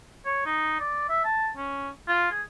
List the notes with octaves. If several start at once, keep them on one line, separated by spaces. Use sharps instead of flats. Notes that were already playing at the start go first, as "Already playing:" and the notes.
C#5
D#4
D5
E5
A5
C#4
F4
G#4